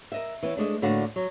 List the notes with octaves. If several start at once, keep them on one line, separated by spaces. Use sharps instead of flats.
A#4 D#5 E5
E3 B3 C#4
G#3 A3 D4
A2 D3 A#3 D4 F#4
F#3